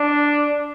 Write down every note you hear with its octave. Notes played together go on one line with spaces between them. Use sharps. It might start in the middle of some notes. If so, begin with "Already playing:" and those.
Already playing: D4